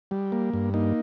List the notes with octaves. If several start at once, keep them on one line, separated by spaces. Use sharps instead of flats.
G3
A#3
G2
A#3 D#4